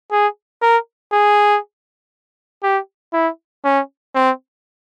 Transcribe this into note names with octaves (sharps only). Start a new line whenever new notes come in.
G#4
A#4
G#4
G4
E4
C#4
C4